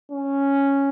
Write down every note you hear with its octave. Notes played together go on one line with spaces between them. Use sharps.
C#4